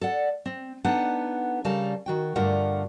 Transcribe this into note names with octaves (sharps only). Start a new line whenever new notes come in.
A4 D5 F#5
C4
B3 D4 D#4 A4 F#5
C#3 G3 A4 A#4 F5 A5
D#3 F#4 G5
G2 D3 A3 F4 A#4 F#5